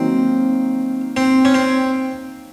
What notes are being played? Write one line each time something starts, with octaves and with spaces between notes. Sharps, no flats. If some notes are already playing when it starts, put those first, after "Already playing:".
Already playing: D#3 F#3 A#3 C4 D#4
C4
C#4
C4